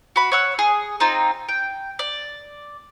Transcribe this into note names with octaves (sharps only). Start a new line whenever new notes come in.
F#4 B5
C#5 F#5 E6
G#4
C4 D#4 F4
G5
D5